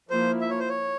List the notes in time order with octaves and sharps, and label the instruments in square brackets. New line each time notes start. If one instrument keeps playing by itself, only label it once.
[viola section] F3 A#3 E4 [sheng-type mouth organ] C5
[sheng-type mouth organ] E5
C#5
C5
C#5